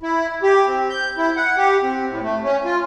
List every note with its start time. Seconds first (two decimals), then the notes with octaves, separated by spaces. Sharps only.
0.03 E4
0.43 G4
0.67 C4
0.90 G6
1.18 E4
1.37 F#5
1.57 G4
1.83 C4
2.09 A2
2.23 A3
2.44 C#4
2.65 F4